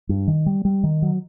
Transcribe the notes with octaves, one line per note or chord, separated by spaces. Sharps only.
G2
D#3
G3
G3
D#3
F#3